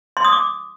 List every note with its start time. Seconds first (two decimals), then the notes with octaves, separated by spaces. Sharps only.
0.17 C6
0.25 D#6
0.32 D6